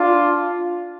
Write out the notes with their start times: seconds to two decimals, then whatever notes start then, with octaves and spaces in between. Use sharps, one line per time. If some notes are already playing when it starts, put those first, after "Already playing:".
Already playing: D4 F4